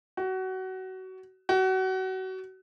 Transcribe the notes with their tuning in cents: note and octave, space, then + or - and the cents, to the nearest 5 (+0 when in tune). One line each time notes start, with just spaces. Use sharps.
F#4 +25
F#4 +30